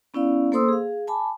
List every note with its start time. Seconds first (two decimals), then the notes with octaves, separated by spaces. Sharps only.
0.14 B3 C#4 E4 D5 F5
0.52 A#3 A4 C5 C6 D#6 E6
0.68 G#4 F5
1.07 G#5 A5 B5 D6